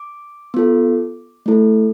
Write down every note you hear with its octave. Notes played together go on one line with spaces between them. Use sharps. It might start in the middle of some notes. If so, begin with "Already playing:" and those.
Already playing: D6
B3 F4 A4
A3 E4 A4